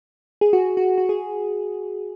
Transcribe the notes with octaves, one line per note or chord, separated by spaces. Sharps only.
G#4
F#4
F#4
F#4
G#4